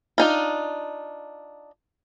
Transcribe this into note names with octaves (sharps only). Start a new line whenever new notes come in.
D4 D#4 F4